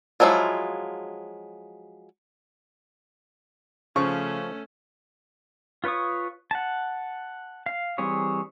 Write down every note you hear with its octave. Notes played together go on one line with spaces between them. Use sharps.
F3 F#3 G#3 E4 F4
C#3 F3 A3 C#4 C#6
F4 B4 C#5 C#6 D#6
F#5 A5
F5
E3 G3 C4 G#4 C#5